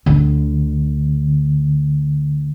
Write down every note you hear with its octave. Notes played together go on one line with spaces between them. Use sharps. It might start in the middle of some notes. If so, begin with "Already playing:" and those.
D2 D3